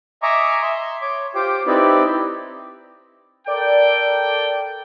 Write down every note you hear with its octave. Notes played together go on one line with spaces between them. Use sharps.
D#5 E5 G#5 A#5 C#6 D6
E5 C6
C#5 D6
F4 G4 C5 G5 D6
C4 D#4 E4 G4 B4 D5
A4 A#4 D5 G5